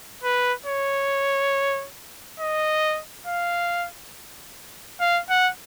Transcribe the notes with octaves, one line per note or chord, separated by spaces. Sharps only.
B4
C#5
D#5
F5
F5
F#5